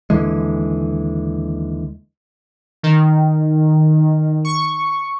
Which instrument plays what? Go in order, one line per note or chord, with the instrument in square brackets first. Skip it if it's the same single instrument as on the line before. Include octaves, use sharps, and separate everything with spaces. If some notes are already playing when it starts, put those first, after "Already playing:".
[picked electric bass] D#2 D3 E3 G#3
[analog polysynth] D#3
C#6